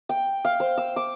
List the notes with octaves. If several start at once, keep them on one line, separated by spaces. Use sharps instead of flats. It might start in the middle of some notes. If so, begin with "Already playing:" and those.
G5
F5
C5
E6
D6